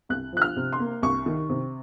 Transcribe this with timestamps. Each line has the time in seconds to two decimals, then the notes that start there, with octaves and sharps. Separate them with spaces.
0.09 C2 F#6
0.33 F3 F#6
0.42 F6
0.56 C3
0.73 C6
0.80 A#3
1.02 C2 C#6
1.26 D#3
1.49 C3